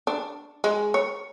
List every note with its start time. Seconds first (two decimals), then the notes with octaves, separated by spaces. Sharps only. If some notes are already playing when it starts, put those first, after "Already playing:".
0.07 D4
0.64 G#3
0.94 C#5